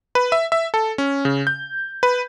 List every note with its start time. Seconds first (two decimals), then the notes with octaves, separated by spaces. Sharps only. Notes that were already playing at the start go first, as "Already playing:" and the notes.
0.15 B4
0.32 E5
0.52 E5
0.74 A4
0.98 C#4
1.25 C#3
1.47 G6
2.03 B4